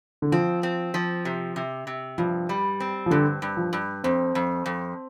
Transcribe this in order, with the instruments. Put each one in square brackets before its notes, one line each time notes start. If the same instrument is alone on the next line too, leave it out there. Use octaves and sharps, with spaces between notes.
[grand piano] D3
[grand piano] F3 [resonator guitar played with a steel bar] C4
[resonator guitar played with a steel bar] C4
F3
C3
C3
C3
[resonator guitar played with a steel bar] G2 [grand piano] F3
[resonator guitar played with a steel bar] G3
C4
[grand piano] F3
[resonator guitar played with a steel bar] G2 [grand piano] D3
[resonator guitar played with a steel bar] G2
[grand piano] F3
[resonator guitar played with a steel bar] G2
[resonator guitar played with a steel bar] F2 [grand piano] C4
[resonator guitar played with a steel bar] F2
F2